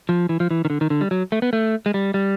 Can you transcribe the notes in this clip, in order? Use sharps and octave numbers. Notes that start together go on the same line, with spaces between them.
F3
E3
F3
E3
D#3
D3
D#3
D3
G3
F#3
A3
B3
A3
G#3
G3
G3